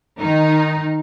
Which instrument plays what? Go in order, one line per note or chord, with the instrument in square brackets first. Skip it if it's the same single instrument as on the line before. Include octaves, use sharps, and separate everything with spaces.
[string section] D#3 D#4